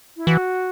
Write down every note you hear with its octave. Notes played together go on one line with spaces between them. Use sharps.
E4
E3 F#4